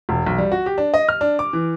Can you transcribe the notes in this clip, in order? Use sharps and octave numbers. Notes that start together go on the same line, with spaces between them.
E1
B1
G3
F#4
G4
D4
D#5
F6
D4
D6
E3